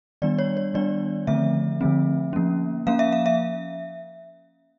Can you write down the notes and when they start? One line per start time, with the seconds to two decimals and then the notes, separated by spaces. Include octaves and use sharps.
0.22 D#3 G3 B3 D4 D5
0.39 C#5
0.57 C#5
0.74 D#3 G3 B3 D4 D5
1.27 D3 F3 A3 C4 E5
1.81 D3 F3 A3 C4
2.33 F3 A#3 C#4
2.87 F3 A#3 C#4 F5
2.99 E5
3.12 F5
3.26 E5